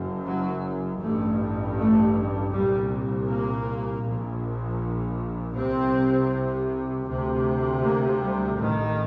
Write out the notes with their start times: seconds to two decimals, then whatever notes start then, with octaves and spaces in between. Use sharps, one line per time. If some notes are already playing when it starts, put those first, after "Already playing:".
Already playing: F#1 F#2
0.25 F#3
1.00 A1 G2 A3
1.76 A3
2.52 C2 A#2 G3
3.28 A#3
4.04 A#1 A#2
5.56 C2 C3 C4
7.08 D2 C3
7.84 A#3
8.21 G3
8.59 A1 A2 D#3